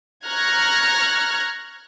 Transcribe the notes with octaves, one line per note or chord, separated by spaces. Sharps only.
A#5 C#6 F6 F#6 G#6 A#6